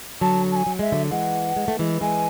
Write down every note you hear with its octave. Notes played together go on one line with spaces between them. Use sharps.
D3 F#3 A5
A5
G#5
F#3
G#3 E5
D3 F#3
E3 G#3 F#5
G#3
A3
E3 G#3
E3 G#3 G#5